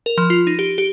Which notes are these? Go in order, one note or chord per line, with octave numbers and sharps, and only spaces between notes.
A#4
F3
F4
D#4
G4
G4